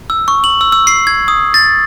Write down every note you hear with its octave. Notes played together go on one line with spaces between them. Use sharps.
E6
C#6
F#7
E6
E6
C7
G#6
D#6
A6